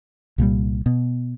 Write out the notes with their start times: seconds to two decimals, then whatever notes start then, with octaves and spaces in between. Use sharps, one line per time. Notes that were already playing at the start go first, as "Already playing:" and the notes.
0.38 C2 A#2 F3 G3
0.86 B2